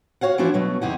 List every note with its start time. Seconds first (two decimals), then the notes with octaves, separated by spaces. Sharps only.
0.21 F#4 C#5 F5 F#5
0.38 E3 F3 C#4 D4 E4 F#4
0.54 B2 F#3 A3
0.81 E2 C3 D#4 E4 F#5